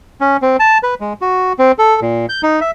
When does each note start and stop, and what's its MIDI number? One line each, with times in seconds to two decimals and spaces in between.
0.21 0.37 61
0.42 0.57 60
0.60 0.78 81
0.83 0.94 71
1.01 1.13 56
1.21 1.53 66
1.59 1.72 60
1.79 2.00 69
2.02 2.26 46
2.29 2.41 91
2.43 2.60 63
2.61 2.71 76